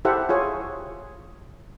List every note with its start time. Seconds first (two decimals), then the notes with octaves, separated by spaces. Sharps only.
0.05 E4 G4 A4 C5 E5 F#5
0.29 F4 G#4 C#5